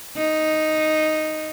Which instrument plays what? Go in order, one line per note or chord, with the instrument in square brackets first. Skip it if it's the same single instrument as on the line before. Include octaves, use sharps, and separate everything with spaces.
[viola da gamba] D#4